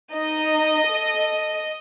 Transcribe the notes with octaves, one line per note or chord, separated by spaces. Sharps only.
D#4 D#5
A4